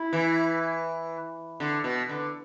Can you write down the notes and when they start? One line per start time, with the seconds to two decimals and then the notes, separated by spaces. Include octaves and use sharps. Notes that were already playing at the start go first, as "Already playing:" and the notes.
Already playing: E4
0.13 E3
1.60 D3
1.84 B2
2.09 D3